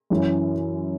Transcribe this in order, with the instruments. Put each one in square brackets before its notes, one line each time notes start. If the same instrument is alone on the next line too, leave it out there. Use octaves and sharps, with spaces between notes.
[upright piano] F#2 E3 C#4 E4